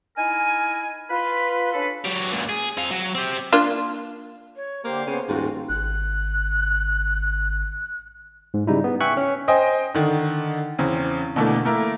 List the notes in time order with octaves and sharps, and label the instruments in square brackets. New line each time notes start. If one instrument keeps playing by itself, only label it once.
[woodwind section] D#4 E4 A#4 G#5
F4 B4
C#4 D4 A4 B4
[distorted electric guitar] F#3 G4
C#2 A#2
G#4
C4 F5
F#3
C4 G4
[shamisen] A#3 D4 F4
[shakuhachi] C#5
[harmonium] D3 G4 [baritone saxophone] A#3 [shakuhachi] C5
[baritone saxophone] C#3 [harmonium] B3
[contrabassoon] D#1 [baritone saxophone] G#2 [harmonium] D#3 F4 [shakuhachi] F#4
[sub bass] G#1 [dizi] F#6
[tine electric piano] G#2
C#3 G3 D#4 E4
B3
E5 G5 G#5 C#6 F#6
C#4
[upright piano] C5 D#5 G5 G#5
D3 D#3
E2 C#3 C4
B2 D3 E3 A3 A#3
A3 A#3 E4 A#4